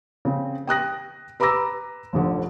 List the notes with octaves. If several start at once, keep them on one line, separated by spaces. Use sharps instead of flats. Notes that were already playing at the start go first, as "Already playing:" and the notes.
C#3 C4
G5 D#6 F#6 A#6
B4 A#5 B5 D6 E6 A#6
F1 A#1 D3